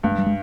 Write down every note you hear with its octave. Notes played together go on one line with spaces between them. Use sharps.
G2 A3
G#3
G3
G#3